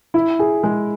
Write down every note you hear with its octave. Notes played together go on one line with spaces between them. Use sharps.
E4
G#4
G#3